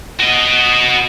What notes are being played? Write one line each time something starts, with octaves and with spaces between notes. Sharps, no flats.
F#4 D#5